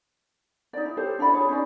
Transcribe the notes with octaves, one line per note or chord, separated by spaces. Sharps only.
D#4 D5
E4
G4 A4 C5 C#5
D4 E4 D5 B5
F4 G#4 C#5
C#4 D#4 D5